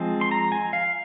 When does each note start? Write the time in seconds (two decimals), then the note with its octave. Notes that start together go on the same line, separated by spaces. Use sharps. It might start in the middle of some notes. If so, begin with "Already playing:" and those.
Already playing: F3 G#3 C4
0.21 C6
0.31 A#5
0.52 G#5
0.73 F5